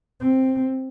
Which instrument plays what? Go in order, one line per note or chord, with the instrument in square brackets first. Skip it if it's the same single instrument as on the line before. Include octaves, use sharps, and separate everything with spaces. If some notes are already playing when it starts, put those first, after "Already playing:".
[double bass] C4